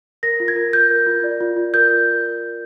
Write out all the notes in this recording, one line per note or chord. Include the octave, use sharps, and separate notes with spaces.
A#4 A#6
F4
G#6
A#4
F4 G6
A#4
F4
D5
F4
F4
A#4 G6